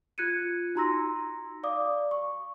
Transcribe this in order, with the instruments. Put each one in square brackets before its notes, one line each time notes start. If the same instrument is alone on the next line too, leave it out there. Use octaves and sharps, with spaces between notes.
[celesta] F4 F#6 G#6 C#7 D#7
D#4 F#4 A#5 C6 E6 A#6
D5 F5 D6 D#6
C#6